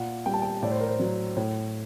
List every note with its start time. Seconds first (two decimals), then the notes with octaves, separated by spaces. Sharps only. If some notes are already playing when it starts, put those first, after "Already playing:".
Already playing: A#2 F#5
0.26 G3 G5
0.34 A5
0.42 G5
0.63 A2 D5
0.71 C5
0.80 A#4
0.88 C5
0.99 F#3
1.37 A2